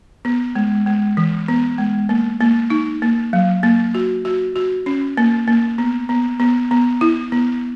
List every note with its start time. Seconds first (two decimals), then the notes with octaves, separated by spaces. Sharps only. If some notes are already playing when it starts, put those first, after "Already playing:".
0.25 B3
0.55 G#3
0.86 G#3
1.17 E3
1.48 B3
1.78 G#3
2.09 A#3
2.40 A#3
2.70 D#4
3.02 A#3
3.33 F#3
3.63 A#3
3.95 F#4
4.25 F#4
4.56 F#4
4.86 C#4
5.17 A#3
5.48 A#3
5.78 B3
6.09 B3
6.40 B3
6.71 B3
7.01 E4
7.32 B3